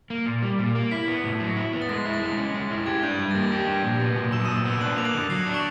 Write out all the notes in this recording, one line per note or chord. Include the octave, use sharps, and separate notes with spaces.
A#3
A#2
G3
A#2
A#3
E4 B6
B3
A2
F#3
E4
B3
A6
G#3 A#6
E4
A6
G#3
C#4
G#3
E4
G4 G#6
D4 G6
G3 G#6
A6
A#3 A#6
G4
D4
A#2
B3
A#2
F#3 E6 E7
D#6 D#7
A#2
E6 E7
B3
D4 F#6 F#7
A#3 F7
F#6 F#7
D3
F#3 C7
D4
C#6 C#7